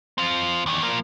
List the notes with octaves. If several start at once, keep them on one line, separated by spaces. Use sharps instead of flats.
C4 F4
E2 D#3
F3 A#3